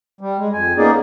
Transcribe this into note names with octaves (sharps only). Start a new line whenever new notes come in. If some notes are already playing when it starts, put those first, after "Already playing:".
G3
G#3
F2 G#5
A#3 B3 C#4 D#4 G#4 D5